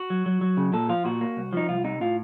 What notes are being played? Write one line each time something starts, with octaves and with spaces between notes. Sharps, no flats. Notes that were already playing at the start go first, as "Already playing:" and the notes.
Already playing: F#4
F#3
F#3
F#3
C#3
A#2 A4
F3 F4
A#2 F#4
A#3
C2
F3 D#4
C2 F4
C3 D#4
A2 F4